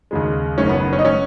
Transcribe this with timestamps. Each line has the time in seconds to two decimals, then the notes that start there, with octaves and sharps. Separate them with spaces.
0.11 D#2 C#3 G#3
0.58 F#1 F#2 D#3 C#4
0.69 B3
0.81 B3
0.93 C#4
0.99 D#4
1.05 F#3 C#4